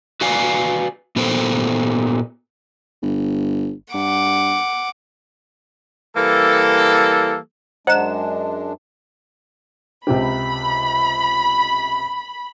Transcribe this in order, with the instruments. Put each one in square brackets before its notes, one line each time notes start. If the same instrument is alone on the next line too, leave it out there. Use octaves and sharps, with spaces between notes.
[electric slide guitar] F#4 B4 D5 F5 G#5
A#2 B3 A4 A#4 C5 G5
[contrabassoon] G1
[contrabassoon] G2 [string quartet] F#5 D6
[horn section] E3 G3 A#3 A4
[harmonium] F#2 G#3 D4 [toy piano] C5 D#5 A#5 [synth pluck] F#5 E7
[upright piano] C#2 C3 G4 [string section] B5